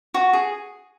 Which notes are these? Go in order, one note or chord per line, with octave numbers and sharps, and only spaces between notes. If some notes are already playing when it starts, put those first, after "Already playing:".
F#4
G#4